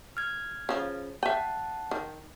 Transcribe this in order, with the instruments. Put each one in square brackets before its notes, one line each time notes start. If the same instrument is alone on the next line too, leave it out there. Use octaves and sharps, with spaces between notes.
[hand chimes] F6 G#6
[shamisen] C#3 F3
[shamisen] E5 G5 [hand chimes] F#5 A5
[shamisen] D#3